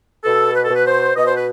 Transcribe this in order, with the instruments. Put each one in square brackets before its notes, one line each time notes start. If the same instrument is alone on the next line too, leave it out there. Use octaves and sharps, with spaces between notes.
[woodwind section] B2 A4
B4
A4
B2
B4
C5
B2 D#5
C5
B4